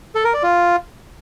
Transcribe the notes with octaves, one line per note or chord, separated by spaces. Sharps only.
A4
A#4
D5
F4